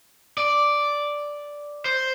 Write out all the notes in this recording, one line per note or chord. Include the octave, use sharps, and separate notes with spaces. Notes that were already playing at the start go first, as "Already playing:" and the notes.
D5
C5